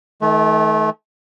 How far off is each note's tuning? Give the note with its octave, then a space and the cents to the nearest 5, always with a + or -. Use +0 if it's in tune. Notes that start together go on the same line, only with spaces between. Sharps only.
D#3 +30 A3 -30